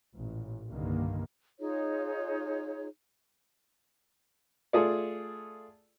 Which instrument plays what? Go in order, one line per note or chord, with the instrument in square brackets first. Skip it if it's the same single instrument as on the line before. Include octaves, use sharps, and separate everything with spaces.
[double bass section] A1 A#2
C2 G2 D3 D#3 A#3
[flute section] D#4 F4 G#4 C#5
[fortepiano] A3 F4 G#4 D5